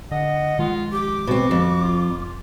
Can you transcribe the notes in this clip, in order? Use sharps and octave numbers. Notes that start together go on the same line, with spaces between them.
D3 D#5 F#5
A#1 D#3 G#3 F4
G4 D6
B2 C4 F#4
F2
F1 F4